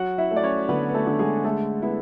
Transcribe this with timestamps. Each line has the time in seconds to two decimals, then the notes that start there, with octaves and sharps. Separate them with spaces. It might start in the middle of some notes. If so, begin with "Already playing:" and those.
Already playing: F#3 F#4 F#5
0.18 E4 E5
0.31 A3
0.36 D5
0.44 C#4 C#5
0.69 D3 B3 B4
0.89 B4
0.94 A3 A4
1.07 D3
1.19 G#3 G#4
1.44 G#3 A3 A4
1.82 B3 E4